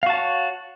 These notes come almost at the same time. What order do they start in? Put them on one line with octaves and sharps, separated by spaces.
F5 F#4 A5 C#5